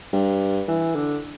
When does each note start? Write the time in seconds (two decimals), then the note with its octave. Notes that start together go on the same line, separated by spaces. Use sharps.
0.13 G2
0.68 E3
0.95 D3